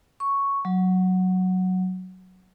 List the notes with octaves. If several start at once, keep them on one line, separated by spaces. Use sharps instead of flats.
C#6
F#3